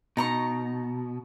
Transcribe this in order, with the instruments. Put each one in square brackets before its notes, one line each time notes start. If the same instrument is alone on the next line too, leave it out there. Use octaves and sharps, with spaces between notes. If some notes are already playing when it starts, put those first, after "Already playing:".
[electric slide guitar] B2 [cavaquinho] D#4 A#5 C#6